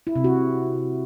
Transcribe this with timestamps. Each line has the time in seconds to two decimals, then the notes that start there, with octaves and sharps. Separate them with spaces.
0.07 E4
0.16 C3
0.24 F#4